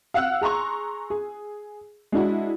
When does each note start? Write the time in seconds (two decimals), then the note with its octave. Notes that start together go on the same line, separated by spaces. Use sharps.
0.14 F5 F#5 E6 F#6
0.41 G#4 A#5 C6 C#6
1.10 G#4
2.12 G#3 D4 E4 F#4